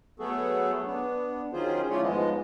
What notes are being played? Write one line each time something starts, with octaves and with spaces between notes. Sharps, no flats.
F#3 A3 B3 F#4 G#4 A4
B3 D4
D#3 F#3 C#4 F4 G#4 C5
A3 C#4 E4 F4 C#5 D5
G#2 F3 G#3 B3 D#5